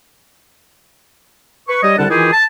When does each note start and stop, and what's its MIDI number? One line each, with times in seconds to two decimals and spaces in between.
1.68 1.80 71
1.68 1.80 85
1.83 1.94 55
1.83 1.94 73
1.83 1.94 75
1.97 2.05 36
1.97 2.05 50
1.97 2.05 55
1.97 2.05 62
1.97 2.05 78
1.97 2.05 81
2.10 2.32 51
2.10 2.32 52
2.10 2.32 64
2.10 2.32 65
2.10 2.32 67
2.10 2.32 68
2.33 2.44 81